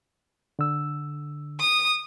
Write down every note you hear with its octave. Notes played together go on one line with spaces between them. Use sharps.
D3 E6
D#6